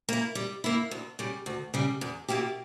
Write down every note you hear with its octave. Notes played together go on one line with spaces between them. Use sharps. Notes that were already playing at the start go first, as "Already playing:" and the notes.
A#3 E4
G3
A#3 E4
D2
C#3 G3
D2
C#3 G3
E2
B2 A#3 E4 G4